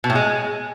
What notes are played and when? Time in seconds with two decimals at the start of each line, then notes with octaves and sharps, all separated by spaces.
0.04 B2
0.10 A2
0.15 G#3